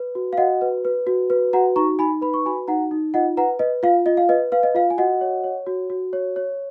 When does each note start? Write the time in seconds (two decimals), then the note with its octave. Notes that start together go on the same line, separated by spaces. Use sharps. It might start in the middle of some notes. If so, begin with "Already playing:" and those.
Already playing: B4
0.15 F#4
0.33 F5
0.38 F#4 D#5 F#5
0.61 B4
0.85 B4
1.07 F#4
1.30 B4
1.53 F#4 F#5 A#5
1.76 D#4 A#5 C#6
1.99 D#4 G#5 B5
2.21 B4 B5
2.34 C#6
2.46 F#4 G#5 B5
2.68 D#4 F#5 A#5
2.91 D#4
3.14 F4 D#5 F#5
3.37 B4 F#5 A#5
3.59 B4 D#5
3.83 F4 F5
4.06 F4 D#5
4.17 F5
4.29 B4 D#5
4.52 B4 F5
4.63 D#5
4.75 F4 F5
4.90 G#5
4.98 F#4 D#5 F#5
5.21 C#5
5.44 C#5
5.66 F#4
5.90 F#4
6.13 C#5
6.36 C#5